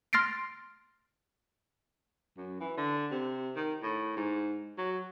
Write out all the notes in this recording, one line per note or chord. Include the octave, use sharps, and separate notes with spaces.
C6 F6 A6 A#6 C7 D7
F#2
E3
D3
C3
D#3
A2
G#2
F#3